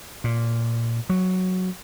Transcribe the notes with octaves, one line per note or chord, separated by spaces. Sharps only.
A#2
F#3